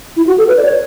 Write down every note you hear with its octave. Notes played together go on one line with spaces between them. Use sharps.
E4
F#4
A4
B4
D5
C#5